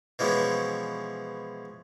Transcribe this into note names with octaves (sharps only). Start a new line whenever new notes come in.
B2 E3 F3 G#3 C#4